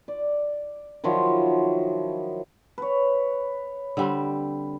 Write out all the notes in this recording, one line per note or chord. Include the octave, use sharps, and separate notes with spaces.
D5
D#3 F3 F#3 E4
B4 C#5
D3 G3 C4